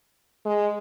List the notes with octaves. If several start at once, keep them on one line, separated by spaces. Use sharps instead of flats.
G#3